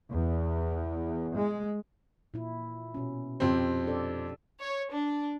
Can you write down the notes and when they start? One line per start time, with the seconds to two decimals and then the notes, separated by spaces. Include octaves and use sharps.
0.11 E2
1.36 G#3
2.34 A#2 E4
2.94 B2 C#4
3.40 F2 C4 G4
3.87 D4 A4 D5
4.61 C#5
4.93 D4